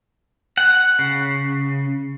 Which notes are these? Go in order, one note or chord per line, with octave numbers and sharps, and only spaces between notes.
F#5
C#3